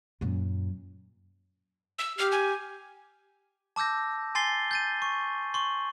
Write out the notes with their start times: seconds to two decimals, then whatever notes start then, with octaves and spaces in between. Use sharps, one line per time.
0.21 F#2 A#2
1.99 E6
2.18 G4 F6
2.32 G#5
3.76 A5 D6 E6 G6 A#6
4.35 G#5 C6 A6 C7 G7
4.71 G6 A6 D#7
5.02 C#6
5.54 C6 C#6